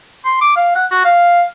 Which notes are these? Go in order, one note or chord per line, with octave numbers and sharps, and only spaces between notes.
C6
D6
F5
F#5
F#4
F5